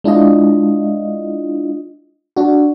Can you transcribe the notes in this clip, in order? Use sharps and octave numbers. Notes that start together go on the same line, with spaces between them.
G#3 D4 E4 F4 D#5
D4 F#4